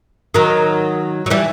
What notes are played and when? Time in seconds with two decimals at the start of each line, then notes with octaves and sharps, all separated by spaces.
0.34 D#3 F#3
1.26 F#3
1.30 E3 G3